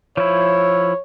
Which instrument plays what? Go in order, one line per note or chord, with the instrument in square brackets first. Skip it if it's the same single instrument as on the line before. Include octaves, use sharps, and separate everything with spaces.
[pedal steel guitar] F3 E4 [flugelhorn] C#5